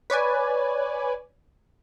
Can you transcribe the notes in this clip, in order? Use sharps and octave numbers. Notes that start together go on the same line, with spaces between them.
B4 C#5 D5 G#5